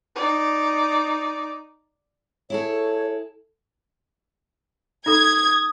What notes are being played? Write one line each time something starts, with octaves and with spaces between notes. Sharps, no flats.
D#4 D5
E4 G#4 A4 C#5
D#4 A4 D#6 G#6